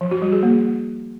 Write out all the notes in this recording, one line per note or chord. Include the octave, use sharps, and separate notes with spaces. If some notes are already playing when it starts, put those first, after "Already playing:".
F3
F#4
G3
G#4
A#3